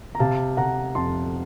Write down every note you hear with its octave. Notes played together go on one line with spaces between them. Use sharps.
A#5
C3 F5 A5
C3 F#5 A#5
F2 A5 C6